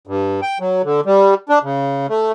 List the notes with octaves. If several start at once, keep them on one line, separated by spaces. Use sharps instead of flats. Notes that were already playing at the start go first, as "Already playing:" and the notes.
G2
G5
F#3
D3
G3
D4
C#3
A3